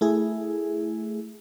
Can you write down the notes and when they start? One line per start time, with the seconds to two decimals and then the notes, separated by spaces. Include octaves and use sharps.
0.01 A3 E4 G#4